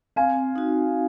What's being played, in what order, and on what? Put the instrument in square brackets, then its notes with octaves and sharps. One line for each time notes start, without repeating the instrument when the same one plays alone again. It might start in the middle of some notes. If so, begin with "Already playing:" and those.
[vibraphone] C4 [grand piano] F5 G#5
[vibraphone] D#4 F#4